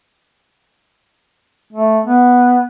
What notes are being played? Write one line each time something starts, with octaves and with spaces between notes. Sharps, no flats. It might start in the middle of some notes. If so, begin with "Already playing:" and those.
A3
B3